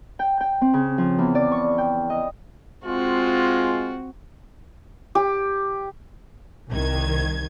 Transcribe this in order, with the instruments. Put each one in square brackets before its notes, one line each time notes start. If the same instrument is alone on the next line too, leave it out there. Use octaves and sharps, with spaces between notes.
[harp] G5
G5
C4
C#3
F3
E2
D5
C#6
G5
D#5
[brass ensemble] G#3 F4 [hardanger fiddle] C4 F#4
[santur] G4
[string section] C2 D#3 G#6